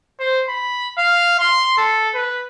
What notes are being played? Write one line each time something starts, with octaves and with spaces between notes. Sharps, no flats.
C5
B5
F5
C6
A4
B4